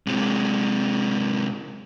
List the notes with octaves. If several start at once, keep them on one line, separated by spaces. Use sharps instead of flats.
C3 G#3